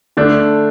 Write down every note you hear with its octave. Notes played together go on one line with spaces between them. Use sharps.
D3 A3 D4